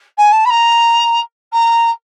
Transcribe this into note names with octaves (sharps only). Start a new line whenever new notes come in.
G#5
A5
B5
A#5
A#5